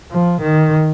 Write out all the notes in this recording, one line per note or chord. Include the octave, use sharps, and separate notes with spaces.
F3
D#3